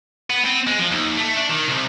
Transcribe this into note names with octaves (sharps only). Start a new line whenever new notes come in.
B3
C4
G#3
F3
D#2
A3
D4
D#3
C2